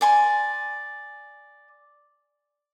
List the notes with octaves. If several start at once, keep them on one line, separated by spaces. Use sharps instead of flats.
D5 G#5 C6